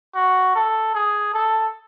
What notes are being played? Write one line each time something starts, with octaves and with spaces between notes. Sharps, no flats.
F#4
A4
G#4
A4